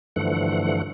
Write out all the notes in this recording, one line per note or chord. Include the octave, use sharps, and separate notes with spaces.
G2 D3 E3 F3 A3 F#5